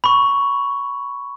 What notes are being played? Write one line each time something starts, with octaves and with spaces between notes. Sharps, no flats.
B5 C#6